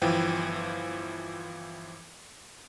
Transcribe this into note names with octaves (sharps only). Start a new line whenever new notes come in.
G1 E3 F3 G5